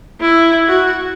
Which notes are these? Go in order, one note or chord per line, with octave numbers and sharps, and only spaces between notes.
E4
F#4